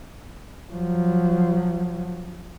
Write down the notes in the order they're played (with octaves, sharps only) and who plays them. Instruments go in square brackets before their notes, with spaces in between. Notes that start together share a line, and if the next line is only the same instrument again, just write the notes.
[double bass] F3 F#3